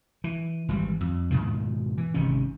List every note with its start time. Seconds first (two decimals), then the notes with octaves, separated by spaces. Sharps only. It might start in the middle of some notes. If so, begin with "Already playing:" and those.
0.24 E3
0.69 G#1 E3 G3
1.01 F2
1.30 G#2 B2 D#3 F3
1.98 E3
2.14 G#1 C3 D#3 C#4